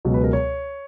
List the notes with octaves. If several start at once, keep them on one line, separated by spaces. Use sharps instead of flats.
C#2 B2 F#3
B4
A#4
C#5